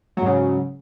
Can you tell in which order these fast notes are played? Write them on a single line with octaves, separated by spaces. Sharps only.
F#3 G#2 C#3